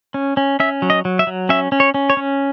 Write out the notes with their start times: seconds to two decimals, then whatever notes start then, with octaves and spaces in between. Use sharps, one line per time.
0.14 C#4
0.37 C#4
0.60 C#4 E5
0.82 F#3
0.90 D#5
1.05 F#3
1.19 E5
1.27 F#3
1.49 C#4 E5
1.72 C#4
1.80 C#5
1.94 C#4
2.10 C#5
2.17 C#4